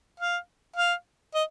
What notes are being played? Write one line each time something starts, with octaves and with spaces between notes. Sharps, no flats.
F5
F5
D#5